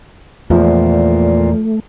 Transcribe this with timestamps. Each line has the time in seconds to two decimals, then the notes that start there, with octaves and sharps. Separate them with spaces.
0.50 E2 A#2 F3 A3